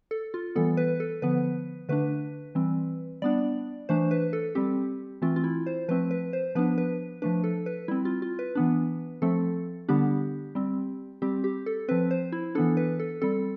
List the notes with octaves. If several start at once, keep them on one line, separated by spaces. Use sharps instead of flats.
A4
F4
E3 G3 B3 A4
B4
A4
D3 F3 B3 B4
D3 A3 D4 B4
E3 G3 C4
G3 B3 D4 D5
E3 A3 D4 C5
B4
A4
G3 C4 G4
E3 A3 C4 F4
F4
E4
C5
F3 A3 C4 B4
B4
C5
F3 B3 D4 B4
B4
F3 A3 D4 B4
A4
B4
G3 C4 E4
F4
F4
B4
E3 B3 D4
F3 A3 C4 A4
D3 G3 B3 D4 G4
G3 C4
G3 C4 G4
G4
A4
F3 C4 B4
C5
E4
E3 B3 D4 A4
B4
A4
G3 C4 A4